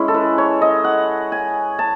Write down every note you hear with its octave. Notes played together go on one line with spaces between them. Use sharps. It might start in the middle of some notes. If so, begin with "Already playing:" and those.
Already playing: G#3 C#4 E4
A4
B4
C#5
D#5
F#5
G#5
A5